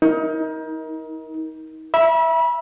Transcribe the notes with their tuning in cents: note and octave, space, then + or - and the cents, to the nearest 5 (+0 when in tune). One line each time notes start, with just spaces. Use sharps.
D#4 +30 A#4 +10
E5 +0 B5 -35